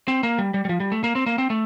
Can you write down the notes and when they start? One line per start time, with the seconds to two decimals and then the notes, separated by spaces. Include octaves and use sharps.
0.08 C4
0.23 A#3
0.38 G3
0.54 G3
0.65 G3
0.69 F3
0.80 G3
0.92 A3
1.04 A#3
1.15 C4
1.26 A#3
1.38 C4
1.50 A3